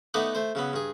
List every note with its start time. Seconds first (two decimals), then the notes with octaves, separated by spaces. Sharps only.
0.14 A3 B3 D#4 A4 D5 F#5
0.35 A3 C5
0.55 C#3 F#3 B3
0.73 G2 G#4